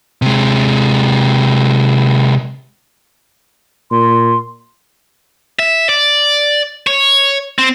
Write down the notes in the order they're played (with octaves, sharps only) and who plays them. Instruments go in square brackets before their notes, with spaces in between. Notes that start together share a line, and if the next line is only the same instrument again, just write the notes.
[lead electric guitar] C3 G#3
[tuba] A#2 [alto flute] C6
[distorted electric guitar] E5
D5
C#5
C4